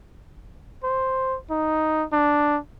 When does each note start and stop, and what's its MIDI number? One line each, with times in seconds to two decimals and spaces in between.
0.84 1.37 72
1.50 2.04 63
2.12 2.58 62